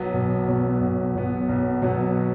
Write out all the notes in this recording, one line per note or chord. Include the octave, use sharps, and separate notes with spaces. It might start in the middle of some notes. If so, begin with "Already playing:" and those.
Already playing: B1 B2 F#3 B3
B1
B2 F#3 B3
B1
B2 F#3 B3
B1
B2 F#3 B3